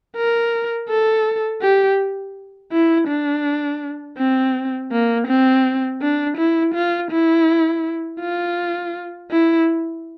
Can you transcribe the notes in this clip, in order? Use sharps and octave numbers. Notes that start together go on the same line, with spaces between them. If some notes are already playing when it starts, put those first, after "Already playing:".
A#4
A4
G4
E4
D4
C4
A#3
C4
D4
E4
F4
E4
F4
E4